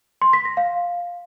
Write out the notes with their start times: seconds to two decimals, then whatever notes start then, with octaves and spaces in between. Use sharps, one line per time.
0.22 C6
0.33 B6
0.45 A#6
0.57 F5